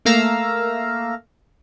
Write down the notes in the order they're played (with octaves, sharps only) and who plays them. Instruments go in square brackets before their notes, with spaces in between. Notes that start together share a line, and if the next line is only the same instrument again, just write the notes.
[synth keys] A3 A#3 F5 A#5 E6